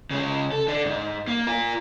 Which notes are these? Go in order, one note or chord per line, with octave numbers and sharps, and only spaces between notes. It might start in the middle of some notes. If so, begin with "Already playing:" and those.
C#3 G#3
A4
D3 D4
G#2
A#3
F4 A#4